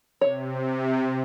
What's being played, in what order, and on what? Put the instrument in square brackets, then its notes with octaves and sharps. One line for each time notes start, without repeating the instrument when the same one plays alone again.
[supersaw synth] C3 [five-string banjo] C#5